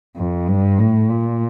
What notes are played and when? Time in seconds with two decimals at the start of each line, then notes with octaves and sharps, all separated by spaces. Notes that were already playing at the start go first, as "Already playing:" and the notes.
0.16 F2
0.48 G2
0.78 A2
1.11 A#2